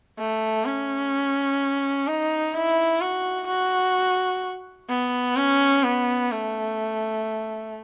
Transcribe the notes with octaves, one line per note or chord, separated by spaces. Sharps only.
A3
C#4
D#4
E4
F#4
F#4
B3
C#4
B3
A3